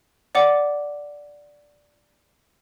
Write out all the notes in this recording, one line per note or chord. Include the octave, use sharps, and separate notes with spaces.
D5 F#5 D6